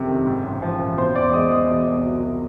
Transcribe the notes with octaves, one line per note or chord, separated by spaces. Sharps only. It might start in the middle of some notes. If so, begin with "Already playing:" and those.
Already playing: F#1 F2 C3 A4
D#3
G#2
A1
F3
A1
B2 C5 C6
E2 D5 D6
G#3 D#5 D#6
E2 D#5 D#6
B2
C2
F#3